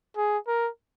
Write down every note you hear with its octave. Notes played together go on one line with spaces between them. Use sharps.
G#4
A#4